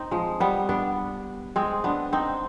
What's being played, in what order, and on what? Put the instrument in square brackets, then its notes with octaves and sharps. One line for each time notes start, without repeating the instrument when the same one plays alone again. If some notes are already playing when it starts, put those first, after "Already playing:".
Already playing: [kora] C4 D#4
F3 G#3
G3 B3
B3 D4
G#3 C4
B3 D4
C4 D#4